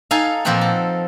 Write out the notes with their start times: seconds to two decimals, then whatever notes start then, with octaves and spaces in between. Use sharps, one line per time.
0.11 D#4 A4 F5 G#5
0.45 A#2 F3 C4 B4 F#5 G5
0.61 A4